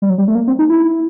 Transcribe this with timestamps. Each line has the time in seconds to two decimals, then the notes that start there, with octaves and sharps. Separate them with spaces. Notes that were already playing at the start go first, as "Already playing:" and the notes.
0.02 G3
0.10 F#3
0.18 G3
0.28 A3
0.35 A#3
0.47 C4
0.59 D#4
0.70 E4